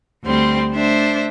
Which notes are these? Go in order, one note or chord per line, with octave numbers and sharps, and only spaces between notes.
D2 G3 C4 C6
A3 D4 C5 E5